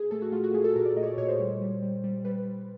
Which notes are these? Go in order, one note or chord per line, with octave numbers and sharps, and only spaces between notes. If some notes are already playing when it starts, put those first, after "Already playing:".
Already playing: A#2 G#4
A3 A4
F#4
A3 F4
F#4
A3 G#4
A4
A#2 A#4
D5
A3 D#5
C#5
D5
A#2 C#5
C5
G3
G3
G3
G3
G3 B4